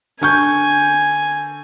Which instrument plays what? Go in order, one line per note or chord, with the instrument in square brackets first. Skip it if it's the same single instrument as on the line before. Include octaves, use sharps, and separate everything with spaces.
[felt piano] D3 C#6 G6 [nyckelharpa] G#5